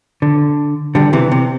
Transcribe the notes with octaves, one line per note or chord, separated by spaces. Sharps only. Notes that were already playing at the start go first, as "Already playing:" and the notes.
D3
D3 G3
C3 E3
C3